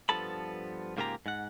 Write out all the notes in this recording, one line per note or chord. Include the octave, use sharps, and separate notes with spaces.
G2 F3 B3 A4 A5 B5
G#2 C#3 A#3 F4 G4 A#5
G#2 F#5